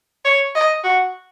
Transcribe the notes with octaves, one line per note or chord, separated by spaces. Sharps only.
C#5
D#5
F#4